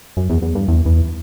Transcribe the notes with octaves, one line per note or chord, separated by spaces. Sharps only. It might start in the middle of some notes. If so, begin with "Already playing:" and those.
F#2
E2
E2
G2
E2
E2